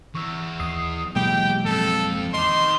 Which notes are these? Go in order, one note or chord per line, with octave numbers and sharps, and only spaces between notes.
E2 C#6 E6
D#2 D#6 C7
B2 E3 F#3 G#3 A#3 G4 G5
F2 A4
D#3 D#5 C6 D6